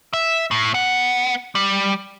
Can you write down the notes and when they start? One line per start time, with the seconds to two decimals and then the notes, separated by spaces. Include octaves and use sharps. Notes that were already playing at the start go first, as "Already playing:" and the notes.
0.13 E5
0.51 A2
0.74 B3 F#5
1.55 G3